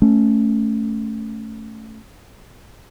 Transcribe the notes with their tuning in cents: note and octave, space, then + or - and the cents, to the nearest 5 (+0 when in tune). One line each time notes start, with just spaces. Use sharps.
A3 +0 C#4 +0